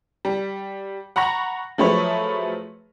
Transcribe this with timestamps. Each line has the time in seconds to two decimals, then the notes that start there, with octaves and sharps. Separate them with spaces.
0.25 G3
1.16 F#5 A#5 B5 C#6 A#6
1.78 F3 F#3 A3 G#4 B4 C#5